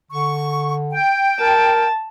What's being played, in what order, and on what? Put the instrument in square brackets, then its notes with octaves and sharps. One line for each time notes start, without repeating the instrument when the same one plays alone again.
[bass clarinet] D3 [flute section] C#6
[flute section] G5
[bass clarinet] A#4 [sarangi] A5